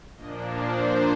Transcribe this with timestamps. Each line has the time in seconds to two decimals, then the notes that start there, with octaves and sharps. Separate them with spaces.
0.17 A#2 F3 A#3 D4 D#5
0.48 C5